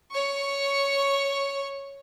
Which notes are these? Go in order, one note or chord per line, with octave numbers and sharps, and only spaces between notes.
C#5 C#6